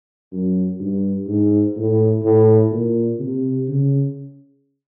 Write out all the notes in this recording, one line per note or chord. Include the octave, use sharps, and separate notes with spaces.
F#2
G2
G#2
A2
A2
A#2
C3
C#3